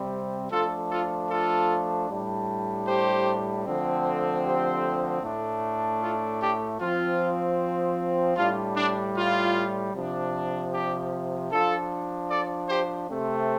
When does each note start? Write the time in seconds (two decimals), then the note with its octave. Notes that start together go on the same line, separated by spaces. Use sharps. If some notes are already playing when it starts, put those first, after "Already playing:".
Already playing: C3 G3 C4
0.51 F3 A3 D4 F4 A4
0.91 F4 A4
1.30 F4 A4
2.09 A2 G3 D4
2.87 G4 C5
3.65 D3 F3 A3 C4
4.44 G4 C5
5.23 A2 A3 D4
6.02 F4 A4
6.41 D4 G4
6.80 F3 C4 F4
8.37 A2 G3 D4 F4
8.76 D4
9.16 F4
9.94 C3 F3 D4
10.73 D4 G4
11.52 F3 D4 F4 A4
12.30 A4 D5
12.69 G4 C5
13.09 C3 A3 C4